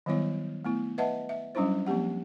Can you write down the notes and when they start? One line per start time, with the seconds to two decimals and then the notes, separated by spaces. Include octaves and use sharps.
0.06 D#3 F#3 G3 B3 E4 C#5
0.65 A3 B3 E4
0.98 B4 D#5 E5 F#5 A5
1.29 E5
1.55 F#3 G3 C#4 D4 E4 C5
1.86 F3 A#3 C4 G4 F#5